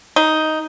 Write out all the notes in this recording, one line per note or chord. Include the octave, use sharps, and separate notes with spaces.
D#4